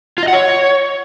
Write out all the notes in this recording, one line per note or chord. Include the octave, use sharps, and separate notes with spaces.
F4
D#5
F#5
C#5